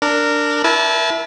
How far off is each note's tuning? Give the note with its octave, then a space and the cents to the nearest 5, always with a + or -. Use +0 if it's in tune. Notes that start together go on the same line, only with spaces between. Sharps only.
D4 +0 A#4 -15
E4 +0 A#4 +40 A5 -30